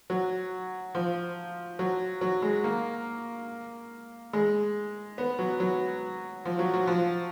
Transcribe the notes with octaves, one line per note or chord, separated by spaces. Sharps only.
F#3
F3
F#3
F#3
G#3
A#3
G#3
B3
F#3
F#3
F3
F#3
F#3
F3